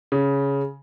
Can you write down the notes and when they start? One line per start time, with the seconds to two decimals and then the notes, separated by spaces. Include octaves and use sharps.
0.12 C#3